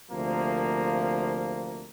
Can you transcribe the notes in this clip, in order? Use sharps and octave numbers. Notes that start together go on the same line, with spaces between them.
D2 C3 F3 A#3